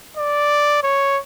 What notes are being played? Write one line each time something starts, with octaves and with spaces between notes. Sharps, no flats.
D5
C#5